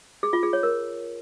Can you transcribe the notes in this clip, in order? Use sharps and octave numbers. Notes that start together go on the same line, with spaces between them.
G#4
F4
G#4
C#5
A#4